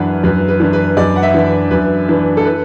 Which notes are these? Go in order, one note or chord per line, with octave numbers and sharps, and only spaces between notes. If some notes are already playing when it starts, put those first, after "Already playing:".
Already playing: F#2 E3 D4 B4 F#5
F#2 B4
B4
E3 D4
B4
F#2 D5
F#5
E5
E3 D4
F#2 B4
E3 D4
A4
B4